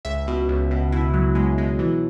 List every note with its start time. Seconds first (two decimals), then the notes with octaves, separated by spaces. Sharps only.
0.05 C#2 E5
0.27 B2
0.49 C#2
0.71 B2
0.92 B2 E4
1.14 C#2 F#3
1.35 B2 G#3
1.58 B2 G#3
1.79 E3 F#3